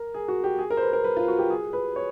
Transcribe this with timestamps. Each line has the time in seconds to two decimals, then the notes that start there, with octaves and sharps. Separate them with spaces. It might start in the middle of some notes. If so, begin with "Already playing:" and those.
Already playing: A#4
0.14 G#4
0.28 F#4
0.44 G4
0.59 G#4
0.70 A#4
0.77 C5
0.82 B4
0.93 A#4
1.04 B4
1.17 F4
1.28 F#4
1.39 G4
1.50 G#4
1.73 B4
1.96 C#5